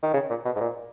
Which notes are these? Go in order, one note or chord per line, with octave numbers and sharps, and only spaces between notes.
D#3
C#3
A#2
B2
G#2
A#2